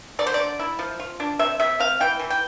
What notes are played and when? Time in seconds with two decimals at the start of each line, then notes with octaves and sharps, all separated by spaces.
0.19 D3 D5
0.27 C5
0.34 D3 D5
0.60 E4
0.79 F3
1.00 F4
1.20 D4
1.39 C3 E5
1.60 C3 E5
1.80 C4 F5
2.00 E3 G5
2.19 E3
2.30 G5